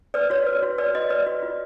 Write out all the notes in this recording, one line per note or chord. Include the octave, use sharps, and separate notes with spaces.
B4 D5
F#4 C#5
B4
F#4
B4 D5
F#4 D#5
B4 D5
F#4
F4